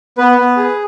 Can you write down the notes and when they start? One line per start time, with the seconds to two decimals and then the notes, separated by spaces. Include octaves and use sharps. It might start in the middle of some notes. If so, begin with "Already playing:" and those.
0.18 B3 B4
0.38 B3
0.57 G#4